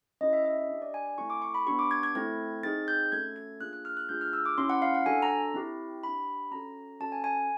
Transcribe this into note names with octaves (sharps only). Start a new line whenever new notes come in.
C#4 E4 G4 D#5
E5
E5
D#5
D4 G4
D5
G#5
G#5
A3 C4 E4 A4 C#6
D6
C#6
B5
B3 D4 G4 C#6
D6
G#6
G#6
A3 C4 E4 A4 G#6
C4 D#4 G#4 A6
G6
A3 C#4 F#4 A4 G#6
G#6
A#3 D4 F4 G#4 F#6
F#6
F6
F#6
A3 D4 F4 G#4 G6
F6
E6
D6
C#4 E4 G4 C6
F#5
F5
F#5
D4 F#4 A4 G#5
A#5
C4 E4 G4
D4 G4 B5
C#4 F#4 A4 A#5
C#4 F#4 A4 A5
G#5
G#5